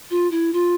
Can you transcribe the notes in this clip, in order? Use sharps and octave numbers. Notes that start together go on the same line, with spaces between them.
F4
E4
F4